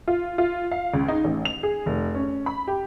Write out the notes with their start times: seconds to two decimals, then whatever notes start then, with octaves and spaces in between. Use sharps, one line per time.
0.08 F4
0.38 F4
0.71 F5
0.94 C#2
1.08 D#4
1.24 A1
1.45 F7
1.63 G#4
1.86 F1
2.15 C#4
2.46 B5
2.67 G4